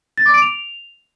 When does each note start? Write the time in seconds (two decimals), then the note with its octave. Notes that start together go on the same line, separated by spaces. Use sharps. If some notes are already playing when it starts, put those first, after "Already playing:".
0.17 A6
0.26 D6
0.34 D7
0.42 F7